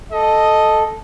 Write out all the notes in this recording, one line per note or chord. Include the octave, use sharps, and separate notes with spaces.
A4 D#5